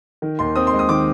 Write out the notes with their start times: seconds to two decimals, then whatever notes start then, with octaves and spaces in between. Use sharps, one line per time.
0.22 D#3
0.39 D#2 C6
0.56 C4 D#6
0.67 C6
0.73 G#3
0.79 D#6
0.89 D#3 D6